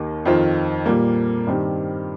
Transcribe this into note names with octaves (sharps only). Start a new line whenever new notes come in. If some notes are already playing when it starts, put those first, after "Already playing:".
Already playing: D#2 D#3 A#3 G4
F2 D#3 C4 F4
A#2 G3 A#3
G2 D#3 C4 G4